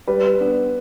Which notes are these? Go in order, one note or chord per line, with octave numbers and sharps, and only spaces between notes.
G3 B4
B3 D4